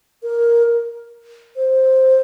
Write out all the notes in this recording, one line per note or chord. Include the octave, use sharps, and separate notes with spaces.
A#4
C5